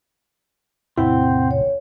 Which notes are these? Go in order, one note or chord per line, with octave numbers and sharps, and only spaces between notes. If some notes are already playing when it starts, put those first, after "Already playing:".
E2 A2 C3 C4 E4 F#5
C#5